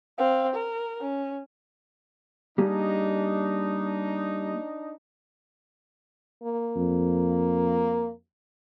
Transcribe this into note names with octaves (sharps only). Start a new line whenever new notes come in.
C4 F5
A#4
C#4
G3 A#3 D4 D#4 G#4
A#3
F2